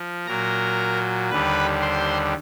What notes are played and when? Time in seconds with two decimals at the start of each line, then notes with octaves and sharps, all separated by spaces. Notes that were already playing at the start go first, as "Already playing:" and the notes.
Already playing: F3
0.27 A#2 F#3 A#4 A#5
1.30 D#2 D3 G3 B4 B5
1.82 C5 C6